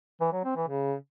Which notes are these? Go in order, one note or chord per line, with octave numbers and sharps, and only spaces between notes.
E3
F#3
C4
E3
C#3